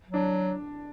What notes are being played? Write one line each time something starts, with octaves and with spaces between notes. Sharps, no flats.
F#3
D4